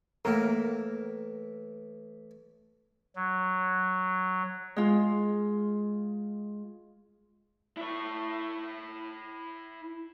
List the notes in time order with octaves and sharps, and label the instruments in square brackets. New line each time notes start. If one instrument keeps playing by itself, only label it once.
[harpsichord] A2 E3 [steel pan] A#3 A#4
[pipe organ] F#3
[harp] G#3 F4
[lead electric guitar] E4 C#5